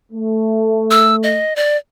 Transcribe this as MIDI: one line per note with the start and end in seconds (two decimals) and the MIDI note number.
0.12 1.40 57
0.91 1.16 88
1.23 1.56 75
1.56 1.77 74